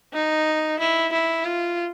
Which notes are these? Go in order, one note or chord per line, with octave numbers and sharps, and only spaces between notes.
D#4
E4
E4
F4